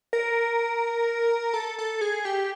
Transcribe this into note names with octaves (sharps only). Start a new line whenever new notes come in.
A#4
A4
A4
G#4
G4